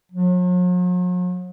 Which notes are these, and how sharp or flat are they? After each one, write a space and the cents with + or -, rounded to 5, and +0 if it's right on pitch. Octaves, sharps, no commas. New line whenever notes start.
F#3 -45